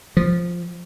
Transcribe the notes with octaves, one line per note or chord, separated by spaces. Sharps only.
F3